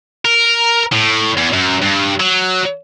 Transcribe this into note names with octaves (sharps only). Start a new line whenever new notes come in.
A#4
A2
E2
F#2
G2
F#3